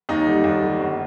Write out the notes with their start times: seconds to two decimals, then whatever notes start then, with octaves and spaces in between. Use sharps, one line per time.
0.09 D#2 D#4
0.26 D3 G3
0.44 D#2
0.63 D3 G3
0.80 G1